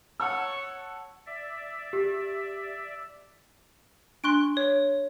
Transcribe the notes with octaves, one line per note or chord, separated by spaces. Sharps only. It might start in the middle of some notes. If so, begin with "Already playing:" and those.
C#5 F#5 A5 E6
D5 E5
G4
D4 C6 C#6 F#6 D7
C#5